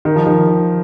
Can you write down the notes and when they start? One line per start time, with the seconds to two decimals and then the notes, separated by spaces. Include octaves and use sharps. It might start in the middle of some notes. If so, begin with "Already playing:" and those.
0.05 D#3
0.16 F3
0.27 D#3